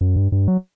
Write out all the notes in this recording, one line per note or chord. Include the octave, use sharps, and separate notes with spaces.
F#2
G2
G2
F#3